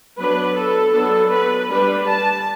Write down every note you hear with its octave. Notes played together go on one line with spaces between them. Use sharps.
F#3 B3 D4 B4
A4
F#3 B3 D4 A4
B4
G3 D4 B4
A5